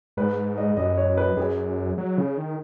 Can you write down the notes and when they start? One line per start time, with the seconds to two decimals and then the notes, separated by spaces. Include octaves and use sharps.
0.17 G#2 B4
0.58 D#5
0.77 F#2 D#5
0.97 C#5
1.18 B4
1.37 F#2 G#4
1.98 F#3
2.18 C#3
2.37 D#3